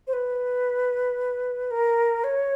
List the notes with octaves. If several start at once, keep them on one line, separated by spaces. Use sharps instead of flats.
C5
B4
A#4
C#5